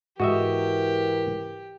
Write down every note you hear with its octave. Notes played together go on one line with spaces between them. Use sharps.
G#2 E3 F#4 G4 A#4 D#5 E5